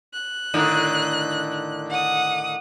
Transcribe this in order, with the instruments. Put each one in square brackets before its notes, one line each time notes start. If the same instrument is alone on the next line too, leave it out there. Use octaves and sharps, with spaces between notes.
[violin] F#6
[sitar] A2 D3 D#3
[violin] F#5 D#6